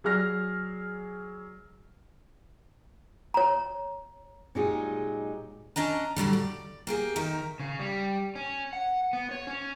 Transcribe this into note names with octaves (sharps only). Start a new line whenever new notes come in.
F#3 G#4 D5 F6 A#6
C#5 A#5
A#2 F#3 G#3 D#4 G4 G#4
C#4 D4 D#5 A#5
A2 D3 F#3 G3
D5
A#3 G4 G#4
D#3 D#4 A#4 E5
C#3
G3
C#4
F#5
B3
C#5
C#4